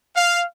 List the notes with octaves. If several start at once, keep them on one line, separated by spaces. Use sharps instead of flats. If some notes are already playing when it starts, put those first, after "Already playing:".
F5